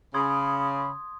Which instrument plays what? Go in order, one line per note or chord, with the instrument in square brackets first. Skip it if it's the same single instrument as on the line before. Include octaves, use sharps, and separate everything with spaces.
[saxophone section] C#3 [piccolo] B5 [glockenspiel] C6 D#6 G#6